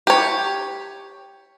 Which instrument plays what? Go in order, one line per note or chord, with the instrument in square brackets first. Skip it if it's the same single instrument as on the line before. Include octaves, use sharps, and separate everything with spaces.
[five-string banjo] G4 C#5